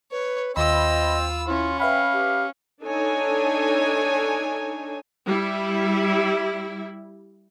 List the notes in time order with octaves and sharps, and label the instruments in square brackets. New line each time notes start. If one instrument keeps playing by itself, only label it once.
[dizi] B4 [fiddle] C#5
[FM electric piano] D#2 B5 [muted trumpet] C4 [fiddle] F4 E6 [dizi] D#5
[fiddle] C#4 [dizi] E4 [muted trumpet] F4
[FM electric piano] B4 E5 B5 [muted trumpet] F5 [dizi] G5
[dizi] G4
[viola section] D4 D#4 A4 C#5 G#5
G3 E4